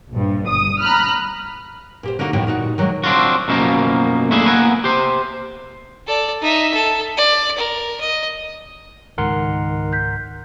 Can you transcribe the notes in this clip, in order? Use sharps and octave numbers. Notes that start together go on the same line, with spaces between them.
A#1 G2
G1 D#6
A#5 B5 F6 F#6
A#2 G4 C5
D3 A#3 D4 D#4 F#4
D#2 A2 D3 F3 E4 G5
A#2 D#4 F#4
D#3 F#3 G#3 A#3
C4 D4 D#4 F4 F#4
F#2 B2 F3 G#3 A#3
A3 A#3 D4 E4 G#4
A#3 B3 A#4 F#5 G#5
G4 C5
A4 D5
D#4 E5
A4
D5
A#4
D#5
C#2 G#2 D#3 G#3 A#4 F#5 C6
F#6 G6 B6